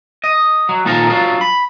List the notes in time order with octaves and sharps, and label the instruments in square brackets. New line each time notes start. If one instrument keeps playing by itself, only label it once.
[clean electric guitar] D#5
F#3
A#2 D#3 F3 A4 A#4
F#3 D4 F4
B5